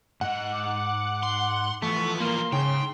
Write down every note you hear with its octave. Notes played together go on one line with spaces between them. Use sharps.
G#2 D#5 F#5
D6
C6
E3 F3 A3 B3 C#6
G3 A#3 F4 C6
C#3 D#4 G#4 G5